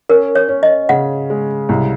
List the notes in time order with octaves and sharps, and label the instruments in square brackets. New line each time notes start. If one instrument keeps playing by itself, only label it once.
[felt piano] C#4 [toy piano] A#4
[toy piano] C#5
[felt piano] C#4
[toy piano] D#5
[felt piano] C#3 [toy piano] F#5
[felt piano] G#3
C2